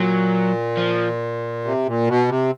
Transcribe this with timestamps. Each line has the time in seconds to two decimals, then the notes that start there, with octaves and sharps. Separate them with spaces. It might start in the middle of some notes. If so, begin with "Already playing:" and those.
Already playing: A#2 F#3
0.77 F3
1.64 C3
1.86 A#2
2.07 B2
2.28 C3